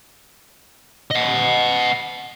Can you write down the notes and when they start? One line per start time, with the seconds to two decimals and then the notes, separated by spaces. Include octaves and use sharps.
1.11 D#5 F#5